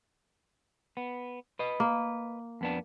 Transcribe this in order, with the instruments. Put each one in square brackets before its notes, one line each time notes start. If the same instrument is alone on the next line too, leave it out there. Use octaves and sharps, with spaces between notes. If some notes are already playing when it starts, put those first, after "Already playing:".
[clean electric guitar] B3
B4 D#5
[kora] A#3
[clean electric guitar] F2 B3 D4